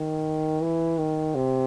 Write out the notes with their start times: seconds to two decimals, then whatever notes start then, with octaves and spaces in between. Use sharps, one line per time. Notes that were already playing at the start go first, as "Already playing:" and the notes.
Already playing: D#3
0.61 E3
0.98 D#3
1.35 C3